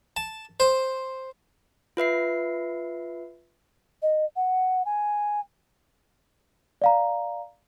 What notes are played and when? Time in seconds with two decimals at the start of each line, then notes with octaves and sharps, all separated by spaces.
0.17 A5
0.60 C5
1.97 F4 B4 E5 C7
4.02 D#5
4.36 F#5
4.85 G#5
6.82 D5 F5 A#5